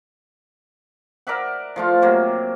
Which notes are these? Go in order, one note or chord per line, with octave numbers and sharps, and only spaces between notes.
A#4 D5 E5 F#5
F3 A3 F4
C3 F#3 A#3